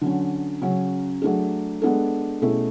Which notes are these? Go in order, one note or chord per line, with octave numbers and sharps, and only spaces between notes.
D3 F#3 C#4
C#3 F#3 C#4
F#3 A3 D4 G#4
G#3 B3 D4 A4
B2 A3 C#4 E4 G#4